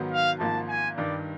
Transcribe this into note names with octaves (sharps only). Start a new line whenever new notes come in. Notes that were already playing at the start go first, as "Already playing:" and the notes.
Already playing: G#2 D#3 F#3 B3
F5
G#1 G#2 F3 A#3 A5
G#5
G2 D#3 G3 D5